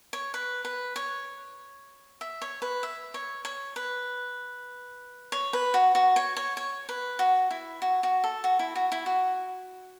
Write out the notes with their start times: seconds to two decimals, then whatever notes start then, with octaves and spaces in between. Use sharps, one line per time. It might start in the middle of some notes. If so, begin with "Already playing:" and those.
0.13 C#5
0.34 B4
0.65 B4
0.96 C#5
2.21 E5
2.42 C#5
2.62 B4
2.83 E5
3.14 C#5
3.45 C#5
3.76 B4
5.32 C#5
5.53 B4
5.74 F#4
5.95 F#4
6.16 C#5
6.37 C#5
6.57 C#5
6.89 B4
7.19 F#4
7.51 E4
7.82 F#4
8.03 F#4
8.24 A4
8.44 F#4
8.59 E4
8.75 F#4
8.92 E4
9.06 F#4